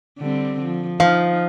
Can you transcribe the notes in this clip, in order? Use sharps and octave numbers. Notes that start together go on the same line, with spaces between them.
D3 G3 C4
F3
F3 D#4 F5